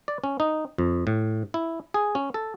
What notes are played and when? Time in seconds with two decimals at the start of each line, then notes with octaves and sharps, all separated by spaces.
0.08 D5
0.24 C#4
0.40 D#4
0.78 F2
1.07 A2
1.54 E4
1.94 G#4
2.15 C#4
2.34 A4